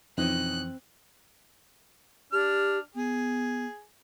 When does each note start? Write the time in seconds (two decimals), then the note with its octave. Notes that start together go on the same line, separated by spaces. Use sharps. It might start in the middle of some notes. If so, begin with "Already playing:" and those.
0.18 F2 B2 E3 C4 C#4 D#4 F#6
2.32 D4 G4 F6
2.95 B3 G#4